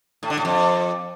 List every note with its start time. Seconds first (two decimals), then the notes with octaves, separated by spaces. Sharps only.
0.23 A2
0.30 D3
0.37 A2
0.45 F2